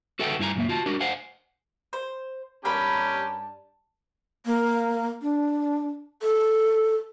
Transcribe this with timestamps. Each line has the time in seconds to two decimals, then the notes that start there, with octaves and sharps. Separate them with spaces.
0.19 F#4 A4 B4 E5 F#5 G5
0.39 G2 E4 F#4 G#5 A#5
0.56 F#2 A#2 C#3 A#3 E5
0.69 F4 F#4 A5
0.86 D4 F#4 A#4
1.01 C5 F5 F#5 G#5
1.93 C5
2.65 G2 C#4 G4 A#4 D5 A5 B5
4.46 A#3
5.22 D4
6.22 A4